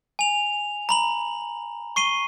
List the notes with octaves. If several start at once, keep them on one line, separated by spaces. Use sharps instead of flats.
G#5 F7
A#5 B5 F#7
C#6 C7 D#7 G7